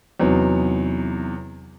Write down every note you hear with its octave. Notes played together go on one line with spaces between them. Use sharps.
E2 C3 F#3 B3 D#4